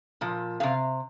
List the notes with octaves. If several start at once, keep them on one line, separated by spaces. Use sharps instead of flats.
A#2 F3
C3 F3 F5